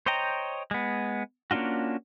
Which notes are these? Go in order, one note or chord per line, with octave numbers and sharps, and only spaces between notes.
C5 C#5 D#5 G5 A#5
G#3 B3
A#3 C#4 D4 F4 F#4